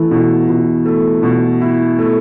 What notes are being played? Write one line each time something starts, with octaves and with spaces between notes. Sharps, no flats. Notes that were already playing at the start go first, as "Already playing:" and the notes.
Already playing: E3 A3 E4
B2
B2
A3
B2
E4
A3